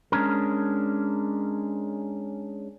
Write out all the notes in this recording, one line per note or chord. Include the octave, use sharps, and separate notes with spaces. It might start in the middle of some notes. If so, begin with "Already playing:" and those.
G#3 C#4 D4 A#4